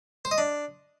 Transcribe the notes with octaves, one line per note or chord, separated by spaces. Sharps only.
C5
D#5
D4